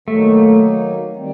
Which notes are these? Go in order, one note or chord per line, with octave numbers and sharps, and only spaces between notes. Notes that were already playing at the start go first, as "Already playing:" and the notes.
D#3 F#3 A3 A#3 D#4
D#3 G3 C4